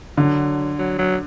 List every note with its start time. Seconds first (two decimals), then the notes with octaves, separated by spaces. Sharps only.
0.17 D3 F#3
0.78 F#3
0.98 F#3